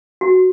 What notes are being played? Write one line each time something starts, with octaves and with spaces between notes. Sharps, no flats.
F#4